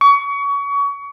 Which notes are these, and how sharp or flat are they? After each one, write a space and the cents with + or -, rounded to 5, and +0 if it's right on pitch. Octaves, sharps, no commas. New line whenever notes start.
C#6 +30